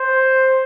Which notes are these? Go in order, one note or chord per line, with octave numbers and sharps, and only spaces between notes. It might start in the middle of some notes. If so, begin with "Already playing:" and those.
Already playing: C5